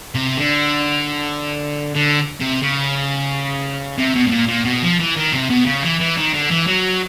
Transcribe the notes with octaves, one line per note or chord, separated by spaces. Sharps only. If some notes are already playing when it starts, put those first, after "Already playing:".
C3
D3
D3
C3
C#3
C3
B2
A2
A#2
A#2
B2
F3
E3
D#3
C3
B2
C#3
E3
E3
D#3
D3
E3
F#3